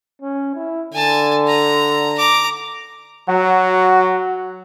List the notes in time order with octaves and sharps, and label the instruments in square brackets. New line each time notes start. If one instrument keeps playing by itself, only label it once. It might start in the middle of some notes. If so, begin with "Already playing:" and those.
[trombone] C#4
E4
[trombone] D3 [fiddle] G#5 A5
[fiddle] A#5
A#5 D6
[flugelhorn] F#3 [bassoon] F#4